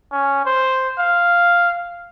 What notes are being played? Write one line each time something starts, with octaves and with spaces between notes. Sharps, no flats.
C#4
C5
F5